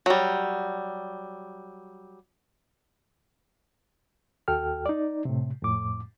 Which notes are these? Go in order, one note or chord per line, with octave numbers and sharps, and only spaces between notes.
F#3 G3
D#2 F#4 A4 G5 F6
D#4 D5
A2 C3
F2 A2 D6